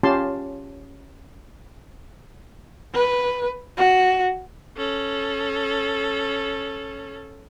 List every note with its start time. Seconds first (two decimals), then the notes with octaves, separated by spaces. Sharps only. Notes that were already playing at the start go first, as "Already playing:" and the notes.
0.03 C#4 F4 G4 A5 C6
2.94 B4
3.77 F#4
4.77 C#4 A4